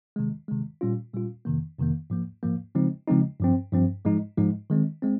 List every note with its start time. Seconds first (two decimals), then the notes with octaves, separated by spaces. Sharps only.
0.16 C3 D#3 G#3
0.48 C3 D#3 G#3
0.81 A#2 G3 C#4 F4
1.14 A#2 G3 C#4 F4
1.45 F2 C3 D#3 A#3
1.78 F2 C3 D#3 A#3
2.10 G#2 F3 A#3
2.43 G#2 F3 A#3
2.75 C#3 F3 G#3 C4 D#4
3.08 C#3 F3 G#3 C4 D#4
3.40 G2 F3 C4
3.73 G2 F3 C4
4.05 G#2 F3 G#3 D#4
4.37 G#2 F3 G#3 D#4
4.70 D#3 G#3 C4
5.02 G#3 C4